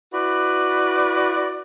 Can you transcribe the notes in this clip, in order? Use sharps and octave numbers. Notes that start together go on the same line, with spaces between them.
E4 F#4 B4 D5